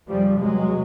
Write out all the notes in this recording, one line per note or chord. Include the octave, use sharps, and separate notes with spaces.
F2 C#3 F3 G3
E2 C3 F#3 G#3